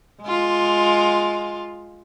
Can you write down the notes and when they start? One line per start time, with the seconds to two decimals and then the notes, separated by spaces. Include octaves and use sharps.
0.22 G#3 F4